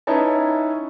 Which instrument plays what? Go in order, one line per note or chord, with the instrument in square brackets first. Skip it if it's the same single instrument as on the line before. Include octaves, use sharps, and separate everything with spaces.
[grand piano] C#4 D#4 E4 B4 C#5 A5